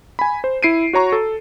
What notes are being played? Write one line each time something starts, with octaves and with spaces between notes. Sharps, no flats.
G#5 B5
C5
E4 C7 D7 D#7
F#4 C#5 A#5 C#6
A4